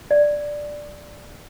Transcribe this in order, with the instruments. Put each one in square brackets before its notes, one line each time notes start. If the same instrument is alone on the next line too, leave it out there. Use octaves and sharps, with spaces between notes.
[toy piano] D5